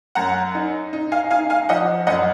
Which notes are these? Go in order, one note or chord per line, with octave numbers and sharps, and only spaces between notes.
F#2 F#5 A#5
D#4
D#4
F5 G#5
D#4 F5 G#5
F5 G#5
F3 D#5 F#5
F#2 D#5 F#5